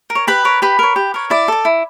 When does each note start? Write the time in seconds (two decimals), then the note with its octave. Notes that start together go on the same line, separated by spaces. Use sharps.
0.10 A#4
0.15 C#5
0.27 G4 B4 B5
0.45 A#4 C#5
0.62 G4 B4 B5
0.79 A#4 C#5
0.96 G4
1.14 A#4 C#5
1.30 E4 D5 D6
1.48 A4 D5
1.65 E4